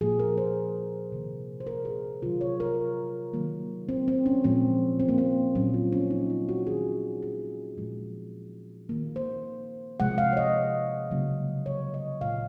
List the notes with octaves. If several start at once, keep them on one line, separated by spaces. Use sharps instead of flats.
A#2 F3 A#3 G#4
A#4
C5
C3 D#3 A#3
C5
A#4
G#4
C3 D#3 F#3 F4
C#5
A#4
D#3 F#3 A#3
C4
C4
C#4
A#2 F3 G#3 C4
C4
A#3
C4
A#2 F#3 A#3 C#4
F4
C#4
D#4
F4
F#4
D#3 A#3 G#4
G#4
A#2 F3 G#3
D#3 A#3
C5
C3 F3 G#3 F#5
F5
C#5
D#5
C#3 F#3 A#3
C#5
D#5
A#2 G#3 F5